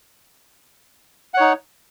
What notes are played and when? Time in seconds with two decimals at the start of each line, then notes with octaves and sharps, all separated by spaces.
1.34 F#5
1.37 C#5
1.40 D#4